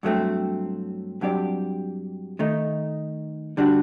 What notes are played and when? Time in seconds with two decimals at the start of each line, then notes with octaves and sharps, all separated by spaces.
0.03 G2 F#3 A3 C4
1.21 G2 F#3 C4 G4 D5
2.39 D#3 A3 D#4
3.57 D3 G3 D4 F#4